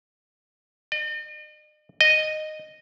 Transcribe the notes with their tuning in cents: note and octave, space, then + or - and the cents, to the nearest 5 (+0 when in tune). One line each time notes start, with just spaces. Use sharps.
D#5 -45
D#5 -10